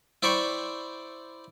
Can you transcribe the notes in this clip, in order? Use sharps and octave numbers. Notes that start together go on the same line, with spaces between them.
E4 C5 D5 G5 C#6